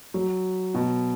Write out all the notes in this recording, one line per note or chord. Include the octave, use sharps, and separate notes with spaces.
F#3
B2